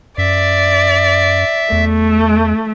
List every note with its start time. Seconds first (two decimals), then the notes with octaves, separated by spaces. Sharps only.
0.18 F#2 D5 E5
1.72 E2 A3